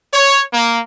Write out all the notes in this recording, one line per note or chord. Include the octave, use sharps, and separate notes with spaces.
C#5
A#3